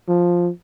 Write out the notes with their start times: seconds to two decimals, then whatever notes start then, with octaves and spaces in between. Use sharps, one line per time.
0.08 F3